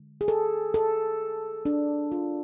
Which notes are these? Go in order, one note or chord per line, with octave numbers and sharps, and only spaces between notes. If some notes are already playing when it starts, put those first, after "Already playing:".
Already playing: D3 G#3
G#4
A4
A4
D4
F4